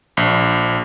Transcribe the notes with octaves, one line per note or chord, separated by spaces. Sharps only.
A#1